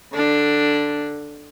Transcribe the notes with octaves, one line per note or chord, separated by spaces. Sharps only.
D3 D4